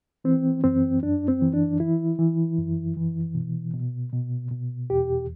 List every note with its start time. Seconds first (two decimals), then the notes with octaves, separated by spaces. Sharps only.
0.24 E3 C4
0.64 F#2 C4
1.03 F#2 D4
1.28 C4
1.42 E3
1.54 D4
1.80 E3 E4
2.18 E3
2.58 F#2
2.97 E3
3.35 B2
3.74 B2
4.13 B2
4.51 B2
4.90 E2 G4